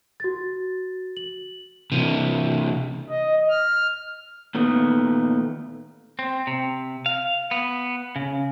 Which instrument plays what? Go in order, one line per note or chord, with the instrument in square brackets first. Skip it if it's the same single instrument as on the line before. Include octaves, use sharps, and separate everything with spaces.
[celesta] F#4 A6
F#7
[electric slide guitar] C3 E3 [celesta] D#7
[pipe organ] D#5
F6
[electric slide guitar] A#2 D#3 A3 B3
[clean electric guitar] C4
C3
F5
B3
C#3